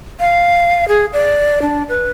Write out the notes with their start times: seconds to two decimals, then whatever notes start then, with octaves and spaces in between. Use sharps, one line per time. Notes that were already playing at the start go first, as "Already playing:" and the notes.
0.20 F5
0.88 G#4
1.13 D5
1.62 D4
1.89 B4